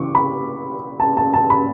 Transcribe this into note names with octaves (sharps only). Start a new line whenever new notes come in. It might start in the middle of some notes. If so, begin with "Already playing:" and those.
Already playing: C#3 E3 C#6 D6
B5
A5
A5
A5
B5